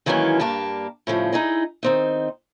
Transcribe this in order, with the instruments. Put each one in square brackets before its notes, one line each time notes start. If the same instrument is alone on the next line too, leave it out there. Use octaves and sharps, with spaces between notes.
[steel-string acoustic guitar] D#3 E3 F#3 G#3 A#3 C#4
G2 A#3 G4 A5
A2 C#3 F3 G3
D#4 E4 G#4 D#5
D#3 C4 D#4